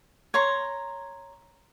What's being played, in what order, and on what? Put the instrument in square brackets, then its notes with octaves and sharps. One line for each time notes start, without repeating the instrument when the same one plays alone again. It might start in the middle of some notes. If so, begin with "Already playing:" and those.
[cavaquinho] C#5 A#5 C6